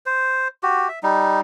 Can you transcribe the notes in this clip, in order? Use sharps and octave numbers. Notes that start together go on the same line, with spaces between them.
C5
F#4 G4
E5
G3 D#4